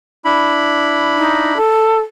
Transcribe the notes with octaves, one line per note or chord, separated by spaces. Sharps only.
D4 E4 B5
D#4
A4